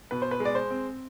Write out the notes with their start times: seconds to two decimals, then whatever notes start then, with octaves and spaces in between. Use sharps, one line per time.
0.11 B2 B4
0.22 C5
0.31 B4
0.40 G#3
0.45 D5
0.55 C5
0.71 C4